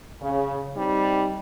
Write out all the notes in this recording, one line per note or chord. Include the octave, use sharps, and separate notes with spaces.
C#3
G3 C4 D#4